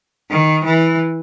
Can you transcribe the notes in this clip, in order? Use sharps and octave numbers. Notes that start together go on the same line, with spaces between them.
D#3
E3